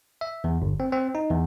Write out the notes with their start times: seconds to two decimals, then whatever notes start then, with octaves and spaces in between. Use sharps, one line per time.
0.21 E5
0.44 E2
0.62 G1
0.80 C4
0.92 C4
1.15 D#4
1.30 E2